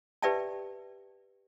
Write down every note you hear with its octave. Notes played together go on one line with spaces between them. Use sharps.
G4 B4 D5 E5 G5 A5